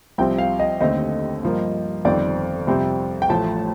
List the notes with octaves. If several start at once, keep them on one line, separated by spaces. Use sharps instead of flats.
C2 C3 F3 C4 G5
F5
D#5
D#2 D3 A3 C4 D#5
G2 F3 A#3
G1 F2 D#3 G3 C4 D5
F2 C3 G3 C4
G5
A1 A2 F3 A3 A5